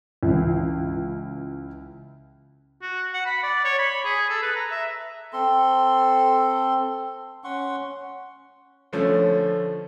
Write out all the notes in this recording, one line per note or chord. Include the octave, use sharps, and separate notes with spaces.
C#2 E3
F#4
F#5
B5
D5
C#5
B5
G#4
A4
B4
A#5
E5
C4 A4 C6
C#4 F#5 C6 C#6
D3 F3 A3 C#4